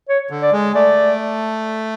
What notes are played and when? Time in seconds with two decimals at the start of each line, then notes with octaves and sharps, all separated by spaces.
0.09 C#5
0.31 D3
0.42 D5
0.52 G#3
0.74 A3 D5